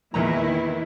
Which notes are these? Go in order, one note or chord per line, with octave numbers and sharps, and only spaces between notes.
E2 A#2 D#3 E3 E4 A#5